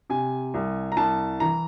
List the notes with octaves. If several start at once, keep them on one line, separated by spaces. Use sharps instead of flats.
C3 G#5
C2
A#5
C2 A5
E3 A#5